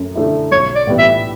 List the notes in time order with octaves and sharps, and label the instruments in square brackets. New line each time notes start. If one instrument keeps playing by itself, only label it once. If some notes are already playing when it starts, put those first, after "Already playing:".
Already playing: [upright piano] F#2 A3
D3 A3 E4
[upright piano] B1 [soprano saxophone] C#5
[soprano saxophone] D5
[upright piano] A2 E3 G3 B3
[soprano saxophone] E5